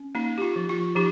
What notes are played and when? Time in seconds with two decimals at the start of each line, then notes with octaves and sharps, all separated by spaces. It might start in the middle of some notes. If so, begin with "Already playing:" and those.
Already playing: C#4
0.15 A#3 D#4
0.38 G4
0.42 F4
0.56 F3
0.69 F4
0.95 F3 D#4 G4